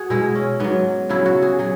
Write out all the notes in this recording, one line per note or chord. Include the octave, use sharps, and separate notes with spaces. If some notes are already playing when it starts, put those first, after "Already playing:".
Already playing: F#4 G#4
B2 G#3 E4
C#4
G#2 F#3 B3
C#3 F#3 E4
F#4
G#4
F#3 G#4